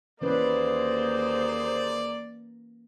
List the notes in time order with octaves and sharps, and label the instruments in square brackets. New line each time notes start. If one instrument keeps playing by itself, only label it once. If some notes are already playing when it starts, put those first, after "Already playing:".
[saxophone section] D#2 G#4 C5 [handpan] E3 C#4 B4 [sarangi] A#3 [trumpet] D5